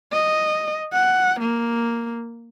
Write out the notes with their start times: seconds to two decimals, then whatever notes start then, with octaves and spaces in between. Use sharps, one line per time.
0.13 D#5
0.93 F#5
1.40 A#3